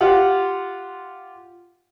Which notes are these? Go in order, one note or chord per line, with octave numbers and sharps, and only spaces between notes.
F4 G4 F5 F#5